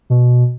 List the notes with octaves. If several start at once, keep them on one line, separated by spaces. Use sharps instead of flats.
B2